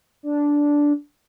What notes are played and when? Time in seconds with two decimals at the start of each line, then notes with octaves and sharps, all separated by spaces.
0.23 D4